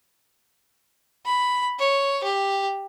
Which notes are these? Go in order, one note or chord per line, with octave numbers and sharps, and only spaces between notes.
B5
C#5
G4